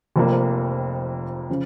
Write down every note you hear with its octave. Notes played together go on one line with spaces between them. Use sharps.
F1 F2 F3 A#3
C#3 F3